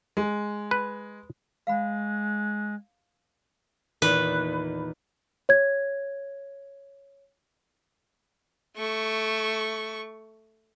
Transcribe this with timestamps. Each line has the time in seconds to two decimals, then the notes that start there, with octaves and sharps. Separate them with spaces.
0.17 G#3
0.71 B4
1.67 G#3 F5 F#5 B5
4.02 E2 A#2 D#3 B4
5.49 C#5 G#6
8.76 A3 C#6